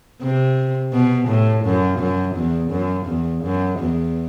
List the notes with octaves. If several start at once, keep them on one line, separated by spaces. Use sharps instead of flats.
C3
B2
A2
F#2
F#2
E2
F#2
E2
F#2
E2